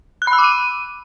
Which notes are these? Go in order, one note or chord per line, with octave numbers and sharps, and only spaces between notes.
F#6
B5
E6
D6
D#7